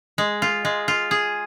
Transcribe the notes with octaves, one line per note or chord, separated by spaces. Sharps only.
G#3
F4
G#3
F4
G#4